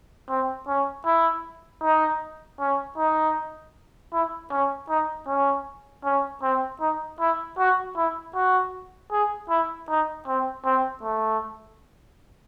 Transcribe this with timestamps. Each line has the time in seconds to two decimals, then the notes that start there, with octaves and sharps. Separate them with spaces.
0.29 C4
0.68 C#4
1.06 E4
1.83 D#4
2.60 C#4
2.98 D#4
4.13 E4
4.51 C#4
4.89 D#4
5.27 C#4
6.04 C#4
6.42 C4
6.81 D#4
7.20 E4
7.58 F#4
7.96 E4
8.35 F#4
9.12 G#4
9.50 E4
9.89 D#4
10.27 C4
10.65 C4
11.03 A3